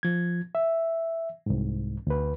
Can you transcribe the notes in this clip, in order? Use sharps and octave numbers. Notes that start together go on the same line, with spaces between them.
F3 G#6
E5
C2 G#2
D2 B4